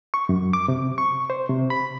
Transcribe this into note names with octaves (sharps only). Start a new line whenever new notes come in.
C#6
F#2
D6
C3
C#6
C5
C3
B5